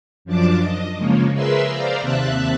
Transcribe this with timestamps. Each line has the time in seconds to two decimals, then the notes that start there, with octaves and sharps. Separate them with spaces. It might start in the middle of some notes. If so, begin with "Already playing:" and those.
0.25 F#2 F3 D4 A5 D6
0.62 D#5
0.98 C#3 F3 G#3 A#3 C#4
1.34 G#4 A#4 B4 E5 C6 E6
1.68 C5 D5 F5 A#5
2.01 D#2 C3 E5 A5 F#6